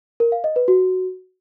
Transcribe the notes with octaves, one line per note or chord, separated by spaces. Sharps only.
A#4
F5
D#5
B4
F#4